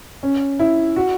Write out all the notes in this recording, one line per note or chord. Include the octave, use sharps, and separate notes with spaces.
C#4
E4
F#4